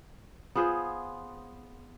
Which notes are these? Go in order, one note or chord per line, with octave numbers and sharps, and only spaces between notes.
B3 F4 G#4 C5